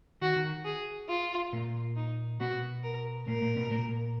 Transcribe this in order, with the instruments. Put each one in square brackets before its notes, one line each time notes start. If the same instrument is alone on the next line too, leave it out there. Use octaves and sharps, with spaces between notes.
[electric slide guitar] D#3 [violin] F#4
[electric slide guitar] D#3
[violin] G#4
F4
[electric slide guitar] A#2 A#3
[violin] D#4
[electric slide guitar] B2 B3 [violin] F#4
[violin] A#4
[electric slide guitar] A#2 A#3 [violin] A#4
[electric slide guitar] A#2 A#3
B2 B3
A#2 A#3